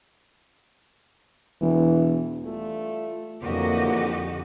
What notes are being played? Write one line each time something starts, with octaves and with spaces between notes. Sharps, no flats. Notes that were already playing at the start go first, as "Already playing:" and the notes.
E1 E3
G3 A3 F4
F2 D3 E3 F#3 A#3 F#4 G4 D#5